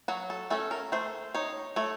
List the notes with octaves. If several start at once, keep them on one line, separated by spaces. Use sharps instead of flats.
F#3 F#4
A4
A3 C#4 A4
A#4
A3 C5
D#4 C#5
A3 C#5